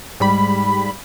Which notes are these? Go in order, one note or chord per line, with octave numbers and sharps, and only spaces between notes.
G#2 G3 B5